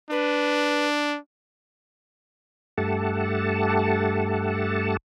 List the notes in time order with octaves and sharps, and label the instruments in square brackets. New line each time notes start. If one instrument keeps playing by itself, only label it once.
[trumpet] D4 [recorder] B4
[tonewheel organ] G2 A3 G4 A4 F#5 A5